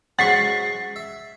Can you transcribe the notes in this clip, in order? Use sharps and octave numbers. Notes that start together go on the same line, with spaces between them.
G#2 F#3 C#4 F#5 C#6 A6 B6 C7
E5